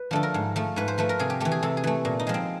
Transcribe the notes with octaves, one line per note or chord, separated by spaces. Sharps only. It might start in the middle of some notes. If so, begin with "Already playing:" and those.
Already playing: B4
D3 F3 A3 A4
A#4
G#2
F3 A3
G#2 B4
C5
F3 A3 B4
A#4
C3 G#4
G4
E3 A3 G4
G#4
C3 A4
G#4
E3 A3
A#2
D#4
F3 G#3
C4